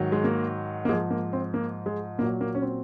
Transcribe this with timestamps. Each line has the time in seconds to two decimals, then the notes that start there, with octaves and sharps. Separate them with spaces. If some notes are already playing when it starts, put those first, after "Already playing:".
Already playing: G#2 D#3 F#3
0.12 G#3
0.24 A#3
0.85 A#3
0.89 G#2 G#3
0.91 F3
1.10 A#3
1.33 C4
1.54 A#3
1.86 G#3
2.18 A#2 A#3
2.23 F#3
2.41 A#3
2.55 C#4
2.62 C4